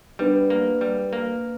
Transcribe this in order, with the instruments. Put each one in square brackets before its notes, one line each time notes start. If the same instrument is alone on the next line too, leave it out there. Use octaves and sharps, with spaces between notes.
[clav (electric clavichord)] G3 [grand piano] B3 D4
[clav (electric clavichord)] A#3
G3
A#3